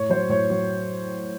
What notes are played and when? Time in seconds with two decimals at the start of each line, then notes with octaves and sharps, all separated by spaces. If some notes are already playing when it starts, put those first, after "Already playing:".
Already playing: A2 C#5
0.09 F#3 C5
0.29 A2 C#5
0.50 F#3 C#5